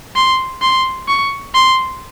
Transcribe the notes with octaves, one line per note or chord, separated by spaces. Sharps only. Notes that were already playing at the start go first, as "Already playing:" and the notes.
C6
C6
C#6
C6